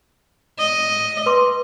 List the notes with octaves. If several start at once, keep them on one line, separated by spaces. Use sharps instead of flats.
D#5
B4 C6 D6